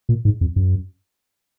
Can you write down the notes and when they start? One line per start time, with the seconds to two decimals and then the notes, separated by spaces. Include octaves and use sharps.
0.09 A#2
0.25 G#2
0.41 F2
0.56 F#2